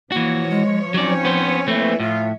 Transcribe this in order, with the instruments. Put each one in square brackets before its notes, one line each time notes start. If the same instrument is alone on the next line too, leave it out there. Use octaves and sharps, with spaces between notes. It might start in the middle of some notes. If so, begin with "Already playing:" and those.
[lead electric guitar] E3 F#4 [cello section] F3 C#5 [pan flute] A#3
[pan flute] G#3
[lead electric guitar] F#3 D5 [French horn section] C4 C#4 [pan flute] D#4
[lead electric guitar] B3 C5
[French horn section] E3 [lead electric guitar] A3 C4 [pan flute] A#3
[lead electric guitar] A2 [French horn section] F4 [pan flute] E5